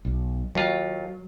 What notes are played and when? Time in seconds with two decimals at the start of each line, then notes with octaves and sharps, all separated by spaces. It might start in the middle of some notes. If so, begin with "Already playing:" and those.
0.05 B1
0.55 D#2 F#3 F4